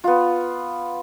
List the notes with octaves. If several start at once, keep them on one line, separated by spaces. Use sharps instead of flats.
B3 F4